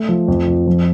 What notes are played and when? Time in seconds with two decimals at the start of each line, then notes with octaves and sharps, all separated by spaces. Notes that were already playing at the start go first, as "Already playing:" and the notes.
Already playing: A3
0.09 F3
0.28 F2
0.48 F2
0.67 F3